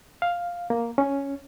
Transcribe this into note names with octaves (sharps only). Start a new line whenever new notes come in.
F5
A#3
C#4